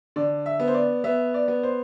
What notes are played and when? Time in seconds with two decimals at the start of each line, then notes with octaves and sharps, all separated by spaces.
0.16 D3 D5
0.46 E5
0.60 B3
0.68 C5
0.74 D5
1.04 B3 E5
1.34 D5
1.48 B3
1.63 C5